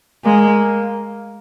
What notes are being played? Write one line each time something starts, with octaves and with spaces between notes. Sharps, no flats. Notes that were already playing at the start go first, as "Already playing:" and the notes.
G#3 A#3